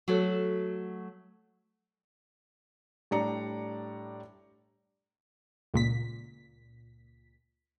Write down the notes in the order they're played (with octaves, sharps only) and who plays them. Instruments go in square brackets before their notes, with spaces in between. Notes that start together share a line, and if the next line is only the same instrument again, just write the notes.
[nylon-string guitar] F#3 A3 F#4 A4
[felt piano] A2 G3 D4 D5 A#5 C#7
[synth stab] C#2 A#2 B6